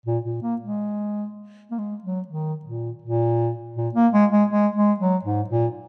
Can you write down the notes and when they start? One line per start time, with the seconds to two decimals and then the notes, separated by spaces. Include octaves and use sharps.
0.06 A#2
0.25 A#2
0.42 A#3
0.61 G#3
1.71 A#3
1.78 G#3
2.04 F#3
2.28 D#3
2.65 A#2
3.02 A#2
3.76 A#2
3.95 A#3
4.13 G#3
4.31 G#3
4.50 G#3
4.75 G#3
4.99 F#3
5.24 G#2
5.49 A#2